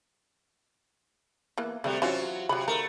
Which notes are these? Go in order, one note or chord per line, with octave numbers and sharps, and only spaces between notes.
E3 A#3 B3
C3 G3 A3 C4 F#4
E3 F#3 C#4 F4 F#4 C5
C3 F#3 F4 B5
D#3 A3 A#4